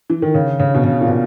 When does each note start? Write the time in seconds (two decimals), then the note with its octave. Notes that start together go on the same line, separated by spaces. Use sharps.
0.10 E3
0.22 D#3
0.34 C#3
0.60 C#3
0.75 B2
0.84 C#3
1.01 A#2
1.08 B2